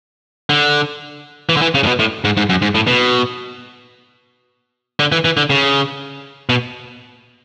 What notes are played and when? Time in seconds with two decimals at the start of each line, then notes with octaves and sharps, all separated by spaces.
0.50 D3
1.49 E3
1.57 D3
1.62 E3
1.75 C#3
1.83 A2
1.87 B2
1.99 A2
2.25 G#2
2.37 G#2
2.49 F#2
2.62 G#2
2.75 A2
2.87 B2
5.00 D3
5.12 E3
5.25 E3
5.37 D3
5.50 C#3
6.49 B2